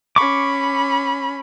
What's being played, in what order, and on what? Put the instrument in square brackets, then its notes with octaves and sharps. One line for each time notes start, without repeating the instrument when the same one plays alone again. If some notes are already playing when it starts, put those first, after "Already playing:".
[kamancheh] C#4 B5 [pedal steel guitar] C#6 D6